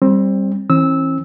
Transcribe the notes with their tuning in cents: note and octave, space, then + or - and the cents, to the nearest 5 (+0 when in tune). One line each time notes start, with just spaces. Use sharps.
G3 +0 C4 +20
E3 -10 C4 +45 E6 -15